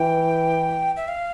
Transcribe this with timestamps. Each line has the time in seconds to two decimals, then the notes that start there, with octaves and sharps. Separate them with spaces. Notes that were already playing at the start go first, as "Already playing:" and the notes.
Already playing: E3 G5
0.97 E5
1.08 F5